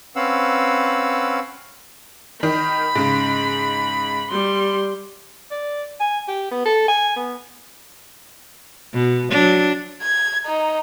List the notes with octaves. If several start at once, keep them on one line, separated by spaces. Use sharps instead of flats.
C4 C#4 B4 F5 F#5 E6
D#3 D#4 D#5 B5
G#2 C#3
G3 C6
D5
G#5
G4
B3
A4
G#5
B3
B2
F#3 D4
G#6
D#4